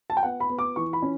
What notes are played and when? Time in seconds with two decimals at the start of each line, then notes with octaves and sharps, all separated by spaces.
0.10 A5
0.17 G5
0.23 B3 F#5
0.40 B5
0.50 B3
0.59 D6
0.76 E3 C#6
0.93 B5
1.02 C#4